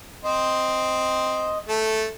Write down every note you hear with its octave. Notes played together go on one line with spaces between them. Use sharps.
C4 C5 D#5
A3 A4